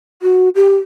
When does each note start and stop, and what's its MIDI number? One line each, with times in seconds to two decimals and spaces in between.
0.22 0.49 66
0.55 0.77 67